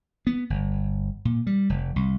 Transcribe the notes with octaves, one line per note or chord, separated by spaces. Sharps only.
B3
G1
A#2
G3
F1
C2